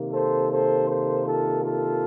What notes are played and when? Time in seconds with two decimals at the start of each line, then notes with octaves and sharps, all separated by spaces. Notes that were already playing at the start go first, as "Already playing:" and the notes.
Already playing: C3 D#3 A#3
0.12 A4 C5
0.50 A4 C5
0.88 A4 C5
1.25 F4 A4
1.63 F4 A4